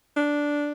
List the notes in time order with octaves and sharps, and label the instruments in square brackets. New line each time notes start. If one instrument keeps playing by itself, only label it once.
[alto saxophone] D4